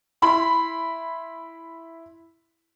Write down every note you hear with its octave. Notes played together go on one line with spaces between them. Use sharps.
E4 B5 C6